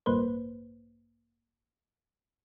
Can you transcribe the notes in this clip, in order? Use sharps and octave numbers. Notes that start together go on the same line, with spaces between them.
A1 D2 G2 A#3 B4 C5